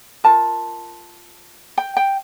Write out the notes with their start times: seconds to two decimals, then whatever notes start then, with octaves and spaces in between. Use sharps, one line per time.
0.24 F4 A#4 A5
1.78 G5
1.97 G5